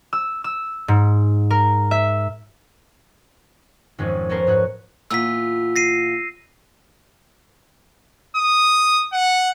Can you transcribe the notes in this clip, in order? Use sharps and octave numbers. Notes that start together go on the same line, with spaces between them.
E6
E6
G#2
A#4
E5
G#1 F2 G#3 C#4
B3 C#4 A4 A#4 C5
G#2 C#4 F#4 C#5 F#6
E2 A#2 F4 E6 B6
A#6 C7 D#7
D#6
F#5